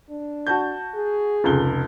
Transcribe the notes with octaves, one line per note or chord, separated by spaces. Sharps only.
D4
F#4 A5 G6
G#4
F1 C#2 G7